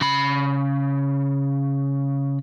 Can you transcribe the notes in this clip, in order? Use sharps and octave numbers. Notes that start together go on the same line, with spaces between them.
C#3 B5